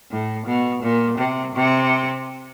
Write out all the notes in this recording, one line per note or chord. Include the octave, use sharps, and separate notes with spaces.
A2
B2
A#2
C3
C3